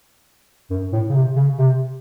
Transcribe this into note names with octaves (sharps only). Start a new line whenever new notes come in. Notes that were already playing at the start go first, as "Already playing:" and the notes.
F#2
A2
C#3
C3
C#3
C3